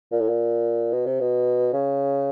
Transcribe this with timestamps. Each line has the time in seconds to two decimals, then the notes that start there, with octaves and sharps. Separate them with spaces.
0.11 A#2
0.20 A2
0.29 A#2
0.93 B2
1.06 C3
1.20 B2
1.73 C#3